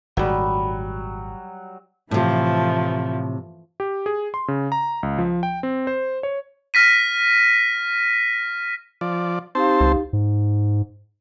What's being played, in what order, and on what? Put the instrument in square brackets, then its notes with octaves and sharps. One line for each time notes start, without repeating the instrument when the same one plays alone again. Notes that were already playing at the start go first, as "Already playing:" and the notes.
[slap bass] G#1 A#2 [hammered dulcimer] F#3 G3
[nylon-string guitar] A2 C3 [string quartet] E3 F3 A3
[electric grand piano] G4
G#4
C6
C#3
A#5
C#2
F3
G5
C4
C5
C#5
[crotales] F6 A#6 B6 D#7
[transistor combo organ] F3 D5
[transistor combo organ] C4 C5 A5 [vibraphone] D#4 G4 F5
[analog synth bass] C#2
[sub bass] G#2